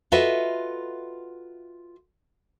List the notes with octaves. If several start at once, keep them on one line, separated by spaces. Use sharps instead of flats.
F4 F#4 A4 B4 D#5 E5